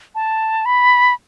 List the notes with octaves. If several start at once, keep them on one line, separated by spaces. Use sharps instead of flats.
A5
B5